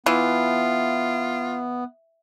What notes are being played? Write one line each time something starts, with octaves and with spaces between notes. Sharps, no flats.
E3 B3 F4